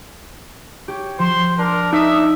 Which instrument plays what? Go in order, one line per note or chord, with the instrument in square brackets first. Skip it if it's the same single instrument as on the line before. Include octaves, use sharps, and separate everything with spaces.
[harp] G4 [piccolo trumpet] C#5
[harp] F3 E7 [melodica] C5 [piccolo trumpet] C6
[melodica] D4 [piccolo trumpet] A#4
[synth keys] D#4 D#6 [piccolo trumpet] E5